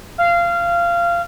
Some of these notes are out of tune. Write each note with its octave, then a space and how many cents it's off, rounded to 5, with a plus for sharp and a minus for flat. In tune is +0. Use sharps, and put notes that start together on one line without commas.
F5 -20